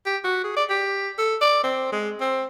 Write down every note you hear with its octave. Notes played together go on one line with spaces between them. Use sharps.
G4
F#4
G#4
D5
G4
A4
D5
C4
G#3
C4